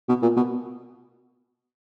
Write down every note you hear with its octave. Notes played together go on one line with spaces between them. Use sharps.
B2
A#2
B2